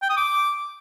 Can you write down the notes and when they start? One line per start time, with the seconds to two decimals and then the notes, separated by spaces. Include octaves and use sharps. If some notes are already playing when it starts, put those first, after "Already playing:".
0.02 G5
0.10 D#6
0.17 D6